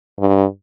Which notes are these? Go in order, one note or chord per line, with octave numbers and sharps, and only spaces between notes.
G2